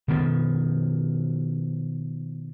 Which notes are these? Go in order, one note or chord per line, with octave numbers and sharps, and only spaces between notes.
B2 D#3 F3